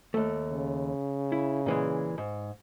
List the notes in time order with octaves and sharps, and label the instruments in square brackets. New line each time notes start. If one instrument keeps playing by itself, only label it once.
[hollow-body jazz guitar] D#2 A3
[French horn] C#3
[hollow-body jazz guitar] E4
A#2 E3 G#3
G#2